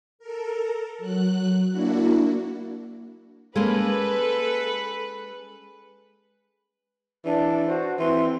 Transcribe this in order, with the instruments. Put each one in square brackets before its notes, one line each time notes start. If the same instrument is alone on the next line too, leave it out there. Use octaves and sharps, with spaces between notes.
[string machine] A4 A#4
F#3 F#6
A#3 D4 E4 F#4
[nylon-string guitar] G#3 A#3 C#4 [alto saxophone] A4 [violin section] B4
[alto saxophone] E3 [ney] D4 [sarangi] D5
[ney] F#4 [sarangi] C5
[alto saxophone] E3 [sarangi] C4 [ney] C6